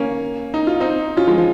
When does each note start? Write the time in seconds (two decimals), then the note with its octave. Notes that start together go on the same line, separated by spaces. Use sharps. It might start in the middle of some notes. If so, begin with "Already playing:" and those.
Already playing: A#3 C#4
0.54 D#4
0.67 F4
0.80 C4 D#4
1.17 C#4 F4
1.27 F3 G#3
1.38 F3